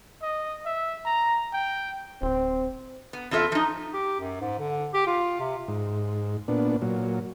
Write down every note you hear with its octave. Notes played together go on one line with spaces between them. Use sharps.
D#5
E5
A#5
G5
D1 C4
B3
E2 C4 F4 A4 E5
F3 D#4
G4
F#2
G#2
D3
G4
F4
C3
G#2
A#2 B3 D4
A#2 F#3